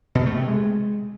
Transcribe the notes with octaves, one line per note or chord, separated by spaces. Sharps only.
B2
A3
C3
G#3